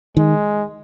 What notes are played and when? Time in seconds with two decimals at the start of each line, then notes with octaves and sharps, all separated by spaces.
0.17 D#3 G#3